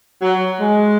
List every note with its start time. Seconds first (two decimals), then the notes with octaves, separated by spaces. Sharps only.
0.22 F#3
0.59 G#3